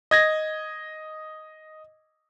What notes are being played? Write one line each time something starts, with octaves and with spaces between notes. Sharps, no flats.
D#5 G#6 A#6